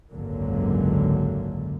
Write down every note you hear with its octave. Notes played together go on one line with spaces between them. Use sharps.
G#1 C#2 F#2 D3 F#3 A#3